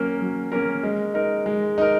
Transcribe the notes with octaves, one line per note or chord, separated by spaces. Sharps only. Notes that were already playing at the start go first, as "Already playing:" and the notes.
Already playing: F#3 A#3 C#4 A#4
F#3
A#3 C#4 A#4
G#3
D#4 A#4
G#3
D#4 A#4